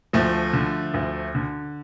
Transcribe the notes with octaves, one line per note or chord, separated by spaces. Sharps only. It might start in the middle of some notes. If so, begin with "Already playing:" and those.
D2 F3 A3
D3
D2
D3